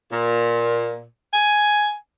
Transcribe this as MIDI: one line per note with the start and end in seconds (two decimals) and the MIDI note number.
0.13 1.04 46
1.34 1.96 80